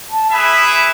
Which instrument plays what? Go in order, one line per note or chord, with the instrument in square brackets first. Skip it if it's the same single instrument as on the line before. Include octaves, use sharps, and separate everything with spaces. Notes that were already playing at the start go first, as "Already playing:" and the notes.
[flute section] A5
[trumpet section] E4 G#4 B4 E5 [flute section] B5
[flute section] B5